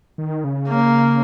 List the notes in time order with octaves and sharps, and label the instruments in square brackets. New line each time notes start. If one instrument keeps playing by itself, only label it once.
[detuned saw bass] D#3
C#3
[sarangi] A#3